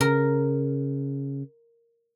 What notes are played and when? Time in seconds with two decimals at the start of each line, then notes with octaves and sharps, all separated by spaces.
0.01 C#3 A#4